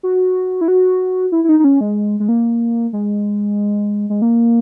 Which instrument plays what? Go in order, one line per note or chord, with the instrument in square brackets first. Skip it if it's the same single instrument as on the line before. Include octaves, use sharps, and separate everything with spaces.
[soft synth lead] F#4
E4
F#4
E4
E4
D#4
D#4
C#4
G#3
G#3
A#3
G#3
G#3
A#3